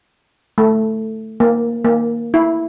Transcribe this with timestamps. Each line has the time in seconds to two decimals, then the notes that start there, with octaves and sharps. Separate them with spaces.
0.58 A3
1.40 A#3
1.85 A#3
2.34 E4